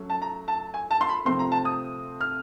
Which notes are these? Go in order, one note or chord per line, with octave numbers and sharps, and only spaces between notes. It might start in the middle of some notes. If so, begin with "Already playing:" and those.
Already playing: F#3 A3 C#4
A5
A#5
A5
G#5
A5
C6
B5
C3 F3 A3 C4 C6
A#5
A5
D#6
F6